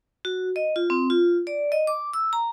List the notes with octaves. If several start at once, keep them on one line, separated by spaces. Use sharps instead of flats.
F#4
D#5
F4
C4
F4
D5
D#5
D6
E6
A#5